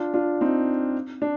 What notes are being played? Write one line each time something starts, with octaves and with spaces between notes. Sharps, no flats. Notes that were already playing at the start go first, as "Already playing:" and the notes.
Already playing: D4 F4
D4 F4
C4 D#4
D4